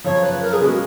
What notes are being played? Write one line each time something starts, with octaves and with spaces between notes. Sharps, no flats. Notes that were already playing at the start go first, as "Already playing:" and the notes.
F#2 C#3 F3 C#5
B4
A#4
G#4
C#3 G#3 B3 F#4